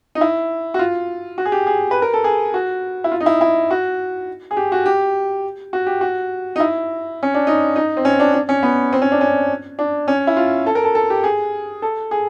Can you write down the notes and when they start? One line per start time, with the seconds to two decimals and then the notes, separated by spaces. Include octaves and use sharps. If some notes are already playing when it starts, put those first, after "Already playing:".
0.15 D#4
0.21 E4
0.74 F#4
0.79 F4
1.38 F#4
1.45 G#4
1.52 G4
1.67 G#4
1.91 B4
2.02 A#4
2.14 A4
2.24 G#4
2.54 F#4
3.04 E4
3.12 F4
3.20 D#4
3.26 E4
3.41 E4
3.71 F#4
4.51 G#4
4.57 G4
4.72 F#4
4.86 G4
5.73 F#4
5.87 G4
6.01 F#4
6.56 D#4
6.60 E4
7.23 C#4
7.34 D4
7.47 D#4
7.76 D#4
7.97 C4
8.05 C#4
8.20 D4
8.34 D4
8.49 C#4
8.63 B3
8.93 C4
9.02 C#4
9.12 D4
9.21 C#4
9.79 D4
10.08 C#4
10.27 E4
10.37 F4
10.66 A4
10.75 A#4
10.84 A4
10.95 A4
11.10 G4
11.24 G#4
11.82 A4
12.11 G#4